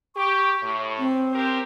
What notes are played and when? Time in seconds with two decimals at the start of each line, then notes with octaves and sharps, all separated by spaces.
0.16 G4 C#6
0.62 A2
0.99 C4
1.33 G4 A#4 C5